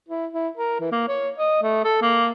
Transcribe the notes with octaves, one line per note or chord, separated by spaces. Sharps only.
E4
E4
A#4
E3
A#3
C#5
D#5
A3
A4
A#3